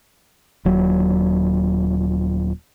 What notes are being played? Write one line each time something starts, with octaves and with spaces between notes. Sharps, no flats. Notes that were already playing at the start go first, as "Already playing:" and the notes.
D#1 F#3